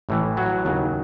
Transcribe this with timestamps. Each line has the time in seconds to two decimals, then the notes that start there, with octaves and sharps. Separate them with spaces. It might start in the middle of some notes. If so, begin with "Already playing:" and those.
0.09 A1 A2 E3
0.37 F#3 F#4
0.65 D#2 C#3 F#3